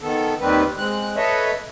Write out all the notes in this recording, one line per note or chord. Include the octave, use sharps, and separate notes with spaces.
D#3 B3 A4
D#2 D#3 G3 C4 B4
G#3 C4 F#6
A4 B4 C#5 D#5 E5